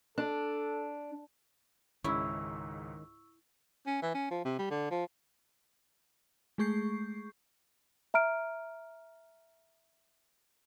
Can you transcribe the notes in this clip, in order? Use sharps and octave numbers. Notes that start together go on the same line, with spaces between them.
D4 A4
C#2 G#2 D#3 G#3 C#4 E4 C#6 E6
C#4
E3
C#4
F3
C3
G3
D3
F3
G#3 A3 G#4 C#6 G6 C7
E5 A#5 F6 D7